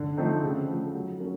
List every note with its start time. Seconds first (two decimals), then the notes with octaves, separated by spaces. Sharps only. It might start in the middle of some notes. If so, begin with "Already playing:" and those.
Already playing: D3
0.17 F3 A3 C4 D#4
0.43 C#3
0.68 F3 A3
0.94 F#3
1.20 A#3 C#4